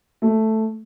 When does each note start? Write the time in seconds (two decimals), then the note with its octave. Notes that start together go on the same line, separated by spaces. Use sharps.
0.22 A3